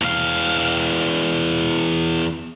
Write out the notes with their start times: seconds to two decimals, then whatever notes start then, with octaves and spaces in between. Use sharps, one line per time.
0.02 E2 F5